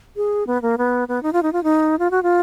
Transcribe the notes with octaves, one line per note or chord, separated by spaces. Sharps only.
G#4
B3
A#3
B3
B3
D#4
F4
D#4
F4
D#4
F4
F#4
F4